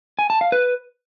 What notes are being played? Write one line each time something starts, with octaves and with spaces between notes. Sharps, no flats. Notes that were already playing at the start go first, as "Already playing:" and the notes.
G#5
A5
F5
B4